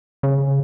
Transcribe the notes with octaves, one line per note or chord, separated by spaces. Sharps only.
C#3